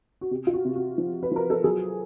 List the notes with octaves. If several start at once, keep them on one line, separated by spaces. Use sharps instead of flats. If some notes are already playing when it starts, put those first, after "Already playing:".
F#4
C3 G4
F4
F#4
C3
F#4
F3
B4
F3 A#4
A4
F#3 G#4